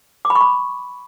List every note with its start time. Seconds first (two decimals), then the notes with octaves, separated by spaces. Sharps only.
0.25 D6
0.30 B5
0.35 C#6
0.41 B5